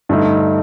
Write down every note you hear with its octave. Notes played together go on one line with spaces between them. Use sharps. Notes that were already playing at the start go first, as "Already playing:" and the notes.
G2 D3 A3 D#4